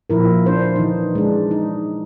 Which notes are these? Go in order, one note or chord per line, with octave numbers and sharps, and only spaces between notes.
A#2 F3 E4 A#4
D4 C5
E3 D#4
G#3 D4
D#4